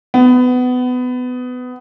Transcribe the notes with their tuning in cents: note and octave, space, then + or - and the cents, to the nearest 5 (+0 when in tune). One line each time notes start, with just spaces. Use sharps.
B3 +20